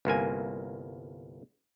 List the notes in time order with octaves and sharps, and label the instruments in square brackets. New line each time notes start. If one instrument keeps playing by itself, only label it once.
[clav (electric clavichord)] G1 C2 A#3 G#5